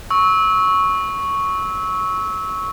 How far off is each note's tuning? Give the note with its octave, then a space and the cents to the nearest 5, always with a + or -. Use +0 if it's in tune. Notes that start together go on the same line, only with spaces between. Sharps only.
C#6 +0 E6 -25